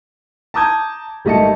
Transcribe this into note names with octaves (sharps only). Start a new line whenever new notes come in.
A5 A#5 D6 D#6 G6 G#6
G#1 G3 A3 D#5 A5 C#7